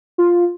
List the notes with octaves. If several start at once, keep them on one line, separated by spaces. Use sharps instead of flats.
F4